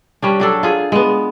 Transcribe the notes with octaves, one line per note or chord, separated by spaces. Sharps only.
G3 C#4 D4
F#3 D4 A4
F4 G#4
G#3 B3